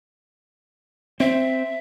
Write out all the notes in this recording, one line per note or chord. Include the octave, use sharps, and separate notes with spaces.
C4 E5